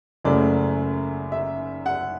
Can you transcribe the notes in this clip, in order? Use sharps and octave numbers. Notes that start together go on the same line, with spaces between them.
F#1 F#2 C#3 F#3 A3 D5
E5
F#5